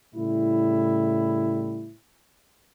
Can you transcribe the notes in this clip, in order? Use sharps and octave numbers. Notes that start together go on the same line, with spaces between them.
A2 C#3 G3 E4